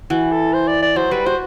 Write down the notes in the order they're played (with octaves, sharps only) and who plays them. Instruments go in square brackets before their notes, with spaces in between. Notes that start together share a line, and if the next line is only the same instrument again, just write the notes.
[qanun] E3 [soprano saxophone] F#4
[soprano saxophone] A4
C5
D5
D5
[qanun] F#3 [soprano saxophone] C5
[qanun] G3 [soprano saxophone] B4
[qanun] F#4 [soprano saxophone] C5